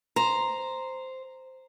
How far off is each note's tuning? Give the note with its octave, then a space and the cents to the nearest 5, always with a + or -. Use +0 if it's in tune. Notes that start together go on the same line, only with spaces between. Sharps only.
C5 -5 A#5 +0